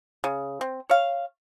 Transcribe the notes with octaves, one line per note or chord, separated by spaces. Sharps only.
C#3
C4
C#5 F5